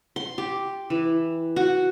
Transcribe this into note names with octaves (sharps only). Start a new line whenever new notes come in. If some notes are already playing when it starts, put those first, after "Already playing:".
C6
G4
E3
F#4